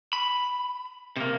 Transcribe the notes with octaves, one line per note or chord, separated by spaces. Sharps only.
B5
C3 A#3